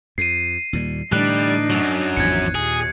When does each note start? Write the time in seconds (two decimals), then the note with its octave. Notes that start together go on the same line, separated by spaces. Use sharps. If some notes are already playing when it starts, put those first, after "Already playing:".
0.18 F2 C7 D#7
0.73 D#2 A#2 G3
1.12 A2 D3 E3 G3 D4 D#4 F#6
1.70 F#2 F#3
2.17 G#1 E2 F3 G#6 C#7
2.55 D#2 A#2 G#4